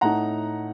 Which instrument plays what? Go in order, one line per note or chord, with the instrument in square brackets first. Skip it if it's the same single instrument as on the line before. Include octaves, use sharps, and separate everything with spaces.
[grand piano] A2 A3 D#4 F#5 A#5